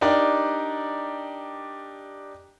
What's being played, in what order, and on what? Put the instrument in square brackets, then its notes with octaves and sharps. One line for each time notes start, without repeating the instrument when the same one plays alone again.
[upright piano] D4 D#4 G4 A#4 D5